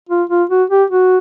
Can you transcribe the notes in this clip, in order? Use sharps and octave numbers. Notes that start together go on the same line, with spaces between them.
F4
F4
F#4
G4
F#4